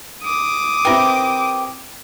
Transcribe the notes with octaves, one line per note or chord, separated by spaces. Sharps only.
D6 D#6
C4 E4 G4 A#4 B4